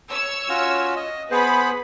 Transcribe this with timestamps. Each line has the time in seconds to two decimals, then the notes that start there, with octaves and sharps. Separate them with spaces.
0.11 C#5 E6
0.49 C#4 F4 F#4
0.96 D#5
1.31 B3 G#4 B4 C5 B5